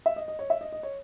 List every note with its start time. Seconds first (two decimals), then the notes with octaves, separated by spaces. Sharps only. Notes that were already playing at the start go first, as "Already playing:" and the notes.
0.06 E5
0.16 D#5
0.28 D#5
0.39 C#5
0.50 E5
0.61 D#5
0.72 D#5
0.83 C#5